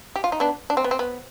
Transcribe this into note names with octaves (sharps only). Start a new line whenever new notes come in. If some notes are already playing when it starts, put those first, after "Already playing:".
G4
F4
D#4
B3 D4
D4
C4
B3
C4
B3